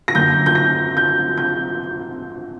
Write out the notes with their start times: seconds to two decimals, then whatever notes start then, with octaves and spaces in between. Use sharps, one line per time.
0.08 A#6
0.15 F#2 D3 A#3 G6
0.46 G6
0.55 A#6
0.97 G6
1.38 G6